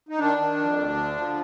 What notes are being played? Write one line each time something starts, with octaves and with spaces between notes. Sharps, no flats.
D#4
D#3 D4
D#3
F2
D2
D3
F3